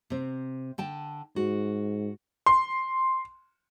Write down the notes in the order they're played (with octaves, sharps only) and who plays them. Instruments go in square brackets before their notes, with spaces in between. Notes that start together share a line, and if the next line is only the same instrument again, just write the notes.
[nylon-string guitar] C3 C4
D3 G5 A5
[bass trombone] G#2 [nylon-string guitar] F#4
[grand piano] C6